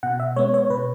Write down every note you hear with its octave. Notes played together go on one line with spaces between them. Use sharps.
B2 F#5
E5
G#3 B3 C#5
C#5
B2 B4